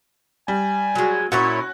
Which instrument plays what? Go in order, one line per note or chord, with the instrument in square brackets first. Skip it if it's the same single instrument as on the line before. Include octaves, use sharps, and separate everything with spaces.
[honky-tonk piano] G3 [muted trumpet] G#5
[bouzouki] F#3 G#3 [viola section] F#4
[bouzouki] A#2 E4 C#5 [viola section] C#4 [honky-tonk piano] F#4